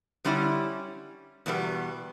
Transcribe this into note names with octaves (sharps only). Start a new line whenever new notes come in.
D3 G3 C#4 E4
E2 B2 G3 B3